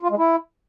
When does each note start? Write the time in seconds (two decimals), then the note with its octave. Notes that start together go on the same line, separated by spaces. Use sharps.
0.03 F4
0.10 G#3
0.18 E4